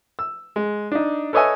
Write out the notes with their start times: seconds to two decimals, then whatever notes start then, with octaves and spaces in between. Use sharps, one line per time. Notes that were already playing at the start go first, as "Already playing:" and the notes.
0.19 E6
0.56 G#3
0.92 D4 D#4
1.33 A4 B4 C#5 D#5 E5 G#5